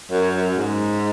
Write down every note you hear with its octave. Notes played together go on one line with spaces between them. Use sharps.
F#2
F#2
G#2